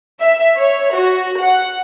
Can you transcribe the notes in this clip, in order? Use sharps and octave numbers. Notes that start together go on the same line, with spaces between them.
E5
C#5
F#4
F#5